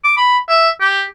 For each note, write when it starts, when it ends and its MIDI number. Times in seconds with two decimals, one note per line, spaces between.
0.04 0.14 86
0.17 0.38 83
0.49 0.70 76
0.81 1.03 67